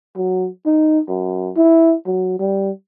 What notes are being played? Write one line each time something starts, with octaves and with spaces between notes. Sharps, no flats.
F#3
D#4
F#2
E4
F#3
G3